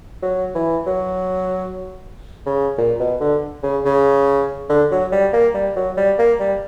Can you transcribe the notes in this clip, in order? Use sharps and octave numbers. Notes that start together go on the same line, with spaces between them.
F#3
E3
F#3
C#3
A#2
B2
D3
C#3
C#3
D3
F#3
G3
A#3
G3
F#3
G3
A#3
G3